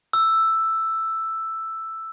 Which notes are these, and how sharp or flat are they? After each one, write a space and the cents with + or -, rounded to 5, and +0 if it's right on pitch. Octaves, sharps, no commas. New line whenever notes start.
E6 +5